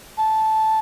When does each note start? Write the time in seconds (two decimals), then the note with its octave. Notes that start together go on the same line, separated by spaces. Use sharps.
0.18 A5